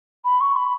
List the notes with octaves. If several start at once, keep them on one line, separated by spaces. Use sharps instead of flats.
B5
C#6
B5